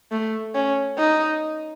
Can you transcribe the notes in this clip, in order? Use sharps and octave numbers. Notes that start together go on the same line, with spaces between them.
A3
C#4
D#4